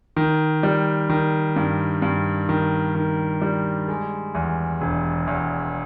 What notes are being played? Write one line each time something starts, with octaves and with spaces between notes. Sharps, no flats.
D#3
G3
D#3
G2
G2
D#3
D#3
G3
G#3
E2
E1
E2